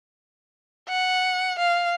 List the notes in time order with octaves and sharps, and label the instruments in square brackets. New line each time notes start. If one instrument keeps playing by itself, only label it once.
[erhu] F#5
F5